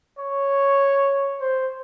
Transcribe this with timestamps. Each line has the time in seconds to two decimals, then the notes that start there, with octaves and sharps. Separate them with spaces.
0.19 C#5
1.40 C5